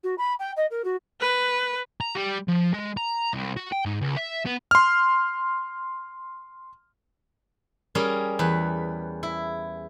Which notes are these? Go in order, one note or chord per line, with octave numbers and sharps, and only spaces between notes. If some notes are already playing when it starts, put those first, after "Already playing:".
F#4
B5
G5
D#5
A#4
F#4
B4
A#5
G3
F3
G#3
A#5
C2
F#4
G5
G#2
C#2
E5
B3
C6 F6
G3 C#4 G#4 A#4
E2 B4
E4